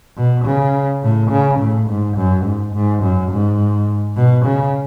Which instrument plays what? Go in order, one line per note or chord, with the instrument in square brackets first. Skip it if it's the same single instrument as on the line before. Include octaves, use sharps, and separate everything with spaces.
[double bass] B2
C#3
A2
C#3
A2
G#2
F#2
G#2
G#2
F#2
G#2
B2
C#3